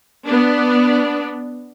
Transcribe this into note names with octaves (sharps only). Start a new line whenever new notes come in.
B3 D4